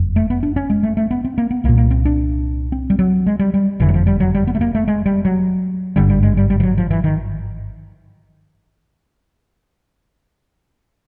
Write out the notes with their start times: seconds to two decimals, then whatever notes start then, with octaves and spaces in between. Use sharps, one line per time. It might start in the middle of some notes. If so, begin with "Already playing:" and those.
Already playing: F#1 F2
0.16 A3
0.30 B3
0.43 D4
0.56 C#4
0.70 G#3
0.83 A3
0.97 A3
1.11 B3
1.25 C4
1.38 A#3
1.51 B3
1.64 C2 A#3
1.69 A#2
1.78 A#3
1.91 C4
2.05 D4
2.72 C4
2.90 G3
2.99 F#3
3.26 G#3
3.39 G3
3.54 G3
3.80 F#1 F2 D3 E3
3.89 F#3
3.94 F3
4.07 G3
4.20 F#3
4.35 G3
4.47 B3
4.55 A3
4.61 A#3
4.75 A3
4.88 G#3
5.06 G3
5.25 F#3
5.96 G#1 G2 D3 G3
6.10 G3
6.23 G#3
6.37 G3
6.50 G3
6.60 F3
6.63 F#3
6.78 F3
6.91 E3
7.04 D#3